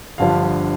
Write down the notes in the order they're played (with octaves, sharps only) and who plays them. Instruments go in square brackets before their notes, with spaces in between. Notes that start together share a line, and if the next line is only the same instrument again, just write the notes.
[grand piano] G1 G2 D3 F3 F5